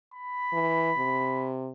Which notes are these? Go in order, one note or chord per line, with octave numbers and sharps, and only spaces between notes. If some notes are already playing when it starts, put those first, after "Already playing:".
B5
E3
C3